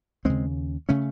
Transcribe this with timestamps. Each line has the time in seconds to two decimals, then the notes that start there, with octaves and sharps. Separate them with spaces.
0.25 D#2 C#3 G#3 C4
0.89 C#3 A3 C#4